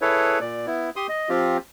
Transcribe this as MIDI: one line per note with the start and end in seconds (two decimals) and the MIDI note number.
0.01 0.39 64
0.01 0.39 68
0.01 0.39 69
0.01 0.39 71
0.01 0.39 73
0.41 0.66 46
0.41 0.66 74
0.67 0.90 59
0.67 0.90 64
0.96 1.07 67
0.96 1.07 84
0.96 1.07 87
1.09 1.29 75
1.29 1.58 53
1.29 1.58 60
1.29 1.58 65
1.29 1.58 67